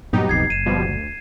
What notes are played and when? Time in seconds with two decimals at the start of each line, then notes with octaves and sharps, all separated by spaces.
0.13 G2 A#2 F#3 B3 D#4 G4
0.29 D1 B1 F2 G#6 C7
0.50 F#1 D#7 E7
0.66 B2 F3 G3
0.84 D2